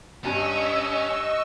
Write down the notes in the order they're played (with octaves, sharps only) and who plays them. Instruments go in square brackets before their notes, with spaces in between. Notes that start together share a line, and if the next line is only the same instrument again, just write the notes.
[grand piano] G2 G#5 A5 [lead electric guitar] C#4 [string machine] D#5 C#6 E6